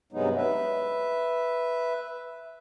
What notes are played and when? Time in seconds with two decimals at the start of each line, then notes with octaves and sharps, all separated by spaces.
0.12 G2 C3 F#3 G#3 B3 D#4
0.37 B4 E5